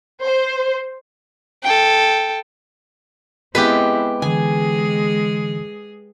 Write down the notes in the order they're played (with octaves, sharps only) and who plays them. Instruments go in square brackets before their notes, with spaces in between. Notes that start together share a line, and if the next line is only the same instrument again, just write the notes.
[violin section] C5
[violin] A4 G5
[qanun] G#3 B3 [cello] C4 E4 [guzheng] G4 B4
[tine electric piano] D3 E3 [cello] G#3 G#4 [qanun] G#5